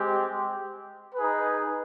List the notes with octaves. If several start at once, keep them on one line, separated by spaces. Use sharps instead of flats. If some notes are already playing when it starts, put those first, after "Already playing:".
Already playing: G#3 C4 G4
D#4 G#4 B4